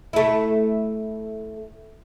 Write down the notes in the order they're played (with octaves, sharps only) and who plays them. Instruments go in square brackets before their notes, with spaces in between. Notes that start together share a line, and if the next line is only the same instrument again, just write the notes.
[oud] A3 E4